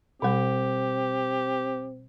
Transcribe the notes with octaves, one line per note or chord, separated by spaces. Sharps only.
B2 G3 C4 G4